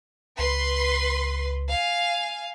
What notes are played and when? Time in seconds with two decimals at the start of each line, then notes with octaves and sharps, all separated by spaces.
0.39 C#2 B4 C6
1.72 F5 G#5